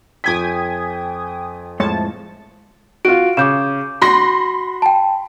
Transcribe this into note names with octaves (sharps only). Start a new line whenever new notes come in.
F2 G5 G#5 D#6 G#6 B6
F2 A2 G#3 C#5 A5 C6
F4 F#4 D7
C#3 D6 G6 E7
F#4 B5 C6 A#6
G5 A5